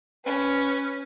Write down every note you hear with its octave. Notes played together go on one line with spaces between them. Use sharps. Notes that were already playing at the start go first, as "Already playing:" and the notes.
C#4 B4